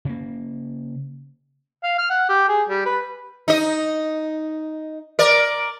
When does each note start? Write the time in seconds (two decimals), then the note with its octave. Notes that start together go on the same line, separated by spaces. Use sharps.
0.05 C#3 A#3
1.83 F5
1.98 F6
2.10 F#5
2.29 G4
2.48 G#4
2.69 G3
2.86 B4
3.48 D#4 D#5
5.19 A#4 D5